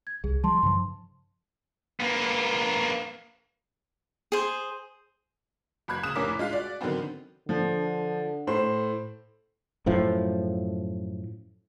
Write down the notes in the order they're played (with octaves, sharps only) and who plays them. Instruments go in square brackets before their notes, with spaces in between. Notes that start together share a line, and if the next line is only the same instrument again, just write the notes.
[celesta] G#6
[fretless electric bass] C2 [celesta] G#4
[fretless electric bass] F3 G3 [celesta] A5 C6
[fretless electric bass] G2 C#3 F3
[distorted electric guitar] A#3 B3
[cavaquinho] G#4 C5
[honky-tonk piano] F#1 B5 F#6 G#6
C#3 D#6 F#6 E7
F1 A2 C#4 A#4 D6 B6
G#3 F4 F5 F#6
F#4 D5
D3 D#3 F#3 B3 C4
[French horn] D3 [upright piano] F3
[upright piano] A2 C5
[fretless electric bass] F#2 A2 F3